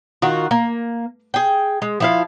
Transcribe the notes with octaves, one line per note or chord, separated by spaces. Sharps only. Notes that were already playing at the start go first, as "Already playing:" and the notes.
D#3 F4 F#4
A#3
G#4 G5
G#3
F3 E4 F5